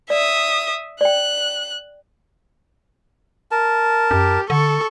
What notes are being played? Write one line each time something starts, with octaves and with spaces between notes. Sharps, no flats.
D5 E5 D#6
D5 G5 F#6
A#4 A5
F#2 G4
D3 A4 C#6